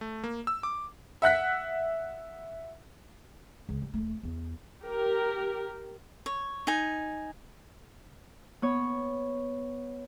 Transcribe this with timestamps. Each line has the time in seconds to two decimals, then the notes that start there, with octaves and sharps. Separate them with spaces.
0.01 A3
0.24 A#3
0.47 E6
0.63 D6
1.22 E5 F#5 F#6 B6
3.69 C#2
3.82 G3
3.93 D#1 A3
4.23 E2
4.82 G4 A#4
6.26 C#5
6.67 D#4 G#5
8.62 B3 C#5